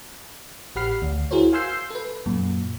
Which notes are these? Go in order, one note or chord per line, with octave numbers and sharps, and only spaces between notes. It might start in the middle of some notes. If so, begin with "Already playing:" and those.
A1 G4 F#5 B5 F6 C7
D2
E4 F#4 G#4 A#4 C5 C#5
F5 G#5 C6 E6 G6 C7
A4 B4
F#2 A#2